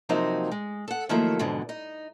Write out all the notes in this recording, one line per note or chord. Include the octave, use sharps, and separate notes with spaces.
C3 F3 F#3 A#3 C4 D#4
G#3
A4 F#5
D#3 F3 F#3 A3 A#3 E4
F2 G#2 B2 D3 E3
D#4